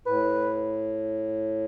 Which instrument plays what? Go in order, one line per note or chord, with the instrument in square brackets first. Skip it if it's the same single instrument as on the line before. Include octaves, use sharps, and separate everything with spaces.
[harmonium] A2 [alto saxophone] B4